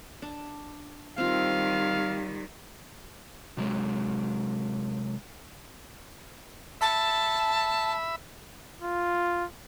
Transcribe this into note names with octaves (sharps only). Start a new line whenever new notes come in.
D4
D#3 G3 C4 F4 F5
C3 F#3 G#3
E5 A5 B5
F4